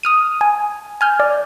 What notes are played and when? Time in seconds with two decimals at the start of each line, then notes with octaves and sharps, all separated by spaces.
0.03 D#6 F6 D#7
0.41 G#5
1.01 G#5 F6 G6
1.20 D5